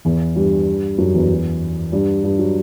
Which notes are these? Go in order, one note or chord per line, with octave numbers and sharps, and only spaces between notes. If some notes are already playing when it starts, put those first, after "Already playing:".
E2 E3
G2 G3
F#2 F#3
E2 E3
G2 G3
G2 G3
F#3